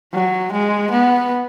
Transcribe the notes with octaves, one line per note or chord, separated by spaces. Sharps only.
F#3
G#3
B3